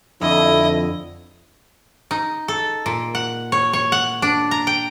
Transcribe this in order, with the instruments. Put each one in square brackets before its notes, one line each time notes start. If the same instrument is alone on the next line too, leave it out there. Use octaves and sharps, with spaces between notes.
[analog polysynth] F2 [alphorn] D3 [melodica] E4 [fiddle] D#5
[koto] D#4
A4
A#2
F#5
C#5
C#5
F#5
D4
A#5
G5